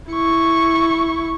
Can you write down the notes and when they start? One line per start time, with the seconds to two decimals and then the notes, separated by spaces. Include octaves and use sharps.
0.11 E4 C#6